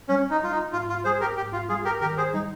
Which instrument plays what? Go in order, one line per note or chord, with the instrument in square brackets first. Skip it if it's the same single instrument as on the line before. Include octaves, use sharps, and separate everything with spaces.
[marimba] G3 [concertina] C#4
[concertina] D#4
[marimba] G3 [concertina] F4
[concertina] D#4
[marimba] G#2 [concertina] F4
[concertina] F4
[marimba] G3 [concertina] G#4 C5
[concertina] G4 A#4
[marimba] G#2 [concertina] G4
[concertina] F4
[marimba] G3 [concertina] F4 G#4
[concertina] G4 A#4
[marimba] D#3 [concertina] G4 A#4
[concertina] G#4 C5
[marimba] G3 [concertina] D#4